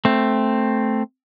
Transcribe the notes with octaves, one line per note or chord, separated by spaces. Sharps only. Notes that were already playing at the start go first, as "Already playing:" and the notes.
A3 C4